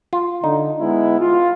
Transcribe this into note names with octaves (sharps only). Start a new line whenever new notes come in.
F4
D3 D#4
G#3 B3 E4
F4